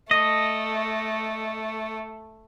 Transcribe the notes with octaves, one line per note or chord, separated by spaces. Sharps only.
A3 D#5